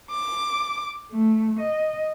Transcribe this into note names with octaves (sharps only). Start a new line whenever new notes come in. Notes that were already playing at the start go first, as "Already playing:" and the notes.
D6
A3
D#5